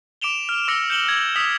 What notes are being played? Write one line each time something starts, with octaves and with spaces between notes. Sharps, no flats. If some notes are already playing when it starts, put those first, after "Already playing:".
D6 D7 E7 F7 G7
F6
D6 E6 A#6 C#7 E7
G6 C#7 E7 F#7 G7
G#6
D#6 E6 B6 F7